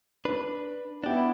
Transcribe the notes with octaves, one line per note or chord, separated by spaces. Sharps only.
D4 B4
B3 D4 E4 G4